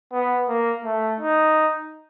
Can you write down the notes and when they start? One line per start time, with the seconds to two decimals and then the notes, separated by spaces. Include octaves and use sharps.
0.13 B3
0.48 A#3
0.84 A3
1.20 D#4